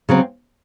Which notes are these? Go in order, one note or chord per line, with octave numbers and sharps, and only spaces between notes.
C#3 F#3 C4